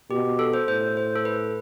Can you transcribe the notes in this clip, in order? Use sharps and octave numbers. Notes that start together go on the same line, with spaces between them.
B2 G4
A4
C5
A2 C5
C5
A4
B4